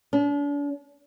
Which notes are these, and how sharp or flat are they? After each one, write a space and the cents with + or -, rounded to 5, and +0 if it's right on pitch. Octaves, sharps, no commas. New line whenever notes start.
D4 -40